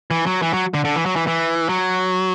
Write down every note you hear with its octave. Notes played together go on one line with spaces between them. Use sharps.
E3
F#3
E3
F#3
D3
D3
E3
F#3
E3
E3
F#3